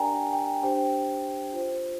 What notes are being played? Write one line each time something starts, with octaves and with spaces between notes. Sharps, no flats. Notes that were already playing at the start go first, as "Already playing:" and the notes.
Already playing: D4 G4 A#4 D5 G5 G#5 A#5
G5
D4 G4 C5 G5
F4 C5